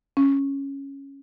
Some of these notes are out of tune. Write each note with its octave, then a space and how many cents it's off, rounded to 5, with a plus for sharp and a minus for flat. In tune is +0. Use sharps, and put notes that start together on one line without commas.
C#4 -5